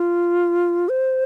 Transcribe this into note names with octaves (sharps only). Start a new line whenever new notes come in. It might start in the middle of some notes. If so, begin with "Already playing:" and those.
Already playing: F4
C5